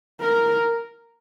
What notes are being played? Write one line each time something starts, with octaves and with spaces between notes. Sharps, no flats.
A#4